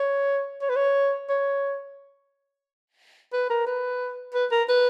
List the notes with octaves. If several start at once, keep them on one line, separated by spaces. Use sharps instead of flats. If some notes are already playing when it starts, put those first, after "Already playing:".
Already playing: C#5
C#5
B4
C#5
C#5
B4
A#4
B4
B4
A#4
B4